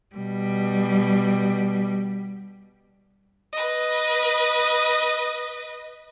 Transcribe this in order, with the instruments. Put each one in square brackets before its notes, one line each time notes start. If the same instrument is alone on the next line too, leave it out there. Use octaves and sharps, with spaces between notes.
[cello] B2 G3
[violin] B4 D#5